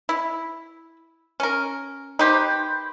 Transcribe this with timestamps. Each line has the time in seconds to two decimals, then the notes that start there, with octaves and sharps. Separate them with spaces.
0.09 E4
1.40 C#4 A#4
2.19 D#4 G4 B4 C5